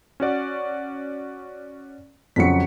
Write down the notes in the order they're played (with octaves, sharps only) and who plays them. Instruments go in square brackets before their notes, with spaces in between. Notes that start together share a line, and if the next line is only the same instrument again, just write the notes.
[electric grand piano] C#4 F#4 D5
[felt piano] F2 C#3 F#3 [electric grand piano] B6 C#7